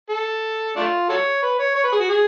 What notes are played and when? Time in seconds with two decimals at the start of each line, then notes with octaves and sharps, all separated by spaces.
0.10 A4
0.76 A3 D4 F4
1.09 F#4 A4 C#5
1.42 B4
1.59 C#5
1.75 C#5
1.84 B4
1.92 G#4
2.00 F#4
2.09 G#4